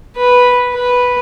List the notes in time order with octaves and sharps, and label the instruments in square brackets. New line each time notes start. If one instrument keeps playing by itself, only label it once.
[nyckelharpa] B4
B4